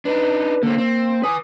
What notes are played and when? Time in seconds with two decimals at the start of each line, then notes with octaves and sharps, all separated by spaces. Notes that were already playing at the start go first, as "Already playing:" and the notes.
0.05 D4 D#4 B4
0.63 D3 A#3 C4
0.78 C4
1.23 B4 G#5 D#6